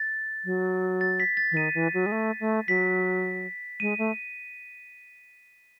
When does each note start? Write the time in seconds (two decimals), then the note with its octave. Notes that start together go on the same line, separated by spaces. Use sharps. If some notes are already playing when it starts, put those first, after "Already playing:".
Already playing: A6
0.45 F#3
1.01 A6
1.20 B6
1.37 A6
1.52 E3
1.56 D#3 D#7
1.75 E3
1.94 F#3
2.06 G#3
2.12 A3
2.40 A3
2.68 F#3 B6
3.80 G#3 D#7
3.98 A3